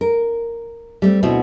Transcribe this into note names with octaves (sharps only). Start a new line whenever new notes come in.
A#4
G3 A3 C4
D2 B2 C4 E4 F#4